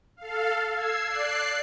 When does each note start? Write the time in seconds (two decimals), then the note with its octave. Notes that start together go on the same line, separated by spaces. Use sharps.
0.17 A4 F5
0.71 E6 G#6 C7
1.07 D5 F#6 C7